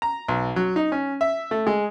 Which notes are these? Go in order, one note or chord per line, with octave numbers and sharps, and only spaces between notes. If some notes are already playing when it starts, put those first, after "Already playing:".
A#5
B1
F#3
D#4
C#4
E5
A3
G#3